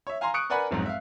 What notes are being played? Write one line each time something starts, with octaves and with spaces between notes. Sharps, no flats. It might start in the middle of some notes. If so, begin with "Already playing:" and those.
C#5 E5
F5 G#5 A#5 C6
C#6 D#6 F#6 C#7 D7
A#4 B4 D5 F#5 G#5 B5
F1 B1 G#2
E5 F5